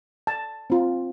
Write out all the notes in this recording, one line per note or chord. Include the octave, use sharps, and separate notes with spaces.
A5
C4 F4